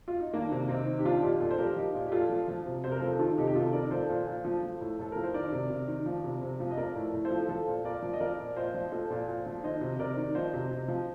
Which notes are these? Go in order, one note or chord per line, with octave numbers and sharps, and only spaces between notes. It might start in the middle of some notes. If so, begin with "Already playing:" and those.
F4
D#4
D#3 A#3 D4
C3
C3 C4 D#4
D#3
G4
F3 D4 F4
A#2 D#4 G4
A#2 F4 A4
C5
F3 G4 A#4
F3 D#4 G4
A#2
G4
A#2 F4 A4
F3
F3
C3
C3 C5
A#4
F3 A4 C5
D#3 F4 A4
C3 D#4 G4
G4
C3 F4 A4
D#3 A#4 D5
F3 A4 C5
A#2
A#2
F3
F3
A2
A2 A4
F3 A#4
C5
D#3 A#4 D5
C3
C3
D#3
F3
C3
C3
F3
D#5
F3 A#4 D5
A2
A2
A4 C5
F3
F3 A4 C5
A#2
A#2 A#4 D5
F3
D#5
F3 A#4 D5
A#2
A#2 C5 D#5
F3
F3 A4 C5
A#2
A#2
F3
D#3 C5 D#5
C3
C3 A#4 D5
D#3
F3 C5 D#5
C3
C3
F3